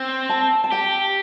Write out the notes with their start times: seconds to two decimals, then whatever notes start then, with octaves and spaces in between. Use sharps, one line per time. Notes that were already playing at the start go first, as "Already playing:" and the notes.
Already playing: C4
0.29 A5
0.64 A5
0.72 G4 G5